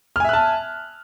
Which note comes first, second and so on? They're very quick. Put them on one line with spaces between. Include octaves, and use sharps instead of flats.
F6 G#5 E5 F#6 A5